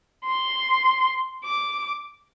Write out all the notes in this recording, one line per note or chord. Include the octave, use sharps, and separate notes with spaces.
C6
D6